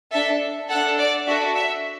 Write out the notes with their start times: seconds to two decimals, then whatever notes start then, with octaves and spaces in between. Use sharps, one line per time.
0.13 D4 A4 E5
0.70 D4 A4 F#5
0.99 D5
1.27 D4 F#4 A4 E5
1.55 E5